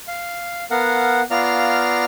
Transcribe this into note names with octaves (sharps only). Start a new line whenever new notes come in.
F5
B3 A#4 F5 F#5
B3 F4 D5 F5 A#5 F6